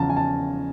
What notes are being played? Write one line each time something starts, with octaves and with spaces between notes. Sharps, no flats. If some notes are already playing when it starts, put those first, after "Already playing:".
Already playing: E2 C#3 F3 A5 A#5
G#5
A5